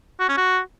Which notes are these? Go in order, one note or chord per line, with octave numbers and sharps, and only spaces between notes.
F#4
C#4
F#4